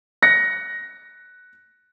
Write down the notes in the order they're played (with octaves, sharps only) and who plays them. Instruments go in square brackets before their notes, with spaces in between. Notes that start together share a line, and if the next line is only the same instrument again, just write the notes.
[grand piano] F#6 A#6 C#7